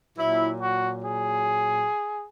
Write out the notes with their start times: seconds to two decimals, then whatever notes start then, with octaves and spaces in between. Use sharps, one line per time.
0.18 A#2 F#3 E4
0.61 F#4
1.04 G#4